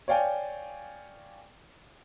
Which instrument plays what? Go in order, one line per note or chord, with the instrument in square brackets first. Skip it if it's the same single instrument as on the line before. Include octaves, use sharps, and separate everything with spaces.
[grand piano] C#5 D5 F5 G5 G#5